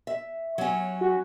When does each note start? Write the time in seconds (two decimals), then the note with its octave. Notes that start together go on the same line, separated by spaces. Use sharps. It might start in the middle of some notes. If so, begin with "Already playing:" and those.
0.07 E5
0.58 F#3 C#4
1.01 F#4